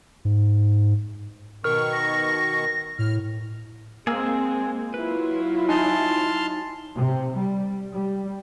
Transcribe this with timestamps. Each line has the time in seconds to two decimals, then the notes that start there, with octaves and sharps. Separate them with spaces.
0.25 G#2
1.64 B2 D#3 A#4 C#6 F6
1.93 A#6
2.99 A2 F6
4.07 G#3 A#3 C4 G#4 G#5 E6
4.94 F#3 E4 F4 B4
5.69 D#4 G#5 A5 C6 F6
6.95 C3
7.35 G3
7.93 G3